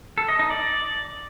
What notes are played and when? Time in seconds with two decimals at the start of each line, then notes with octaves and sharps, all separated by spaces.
0.18 A4
0.28 D#5
0.39 D#4
0.50 D5